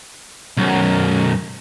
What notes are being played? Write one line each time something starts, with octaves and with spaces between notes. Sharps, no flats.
B1 F#2